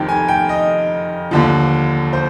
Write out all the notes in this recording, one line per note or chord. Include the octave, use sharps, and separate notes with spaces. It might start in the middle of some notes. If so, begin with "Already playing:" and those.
Already playing: F1 F2 D#3 G5
G#5
G5
D#5
D#2 D3 F3
C5